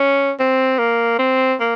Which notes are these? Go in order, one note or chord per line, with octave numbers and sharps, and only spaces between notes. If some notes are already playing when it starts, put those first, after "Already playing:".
Already playing: C#4
C4
A#3
C4
A#3